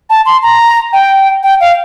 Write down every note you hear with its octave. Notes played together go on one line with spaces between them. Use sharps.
A5
C6
A#5
G5
G5
F5